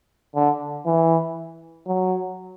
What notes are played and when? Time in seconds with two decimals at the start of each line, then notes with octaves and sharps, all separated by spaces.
0.35 D3
0.86 E3
1.87 F#3